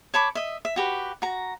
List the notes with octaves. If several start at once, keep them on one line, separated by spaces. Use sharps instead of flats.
C#5 A5 B5 D6
D#5 E5
E5
F#4 G4 B4
F#4 A#5